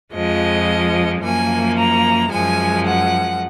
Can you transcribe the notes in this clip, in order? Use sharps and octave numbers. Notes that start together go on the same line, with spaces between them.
F2 F3 G#3 D#5
F#2 F3 A#3 G#5
A#5
F#2 F3 G#3 G#5
F#5